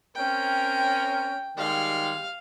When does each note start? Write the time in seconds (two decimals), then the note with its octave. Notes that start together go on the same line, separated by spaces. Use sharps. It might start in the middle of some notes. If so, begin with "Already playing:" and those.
0.15 C4 C#4 A#4 G5
1.57 D#3 G3 G#3 F5